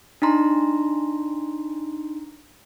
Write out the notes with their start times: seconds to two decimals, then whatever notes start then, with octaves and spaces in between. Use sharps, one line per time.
0.22 D4 D#4 A#5 C6